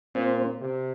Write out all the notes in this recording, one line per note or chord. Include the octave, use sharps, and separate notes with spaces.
A#2 C4
C3